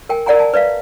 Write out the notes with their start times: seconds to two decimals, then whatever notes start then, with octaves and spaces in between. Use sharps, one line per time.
0.09 A#4 G5 G#5
0.26 A#4 D5 F#5 G#5 A#5
0.39 G#5 A5
0.54 B4 D5 E5 F5